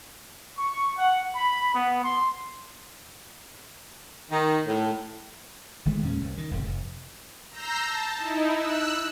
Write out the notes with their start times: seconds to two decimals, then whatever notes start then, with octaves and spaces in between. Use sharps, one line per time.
0.58 C#6
0.98 F#5
1.35 B5
1.74 B3
2.04 C6
4.30 D#3
4.67 A2
5.85 G1 D#3 G#3 A3
6.03 E2 A#2 G#3 C#4
6.21 C2
6.38 D#3
6.51 D1 G#1 F2 C#3
6.67 F1
7.51 A#5 E6 G6 A#6 C7
7.83 A5
8.17 D#4 E4
8.53 E6 F#6